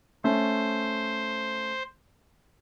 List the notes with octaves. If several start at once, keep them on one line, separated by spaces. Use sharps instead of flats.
A3 C#4 C5